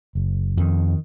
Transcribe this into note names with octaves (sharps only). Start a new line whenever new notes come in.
F#1
F2 D#3